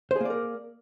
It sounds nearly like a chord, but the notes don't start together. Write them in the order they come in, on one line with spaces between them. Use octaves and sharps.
C5 G#4 A#3 D5 A#4